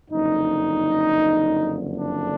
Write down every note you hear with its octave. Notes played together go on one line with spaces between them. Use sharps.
F#1 F2 D3 D#4
D4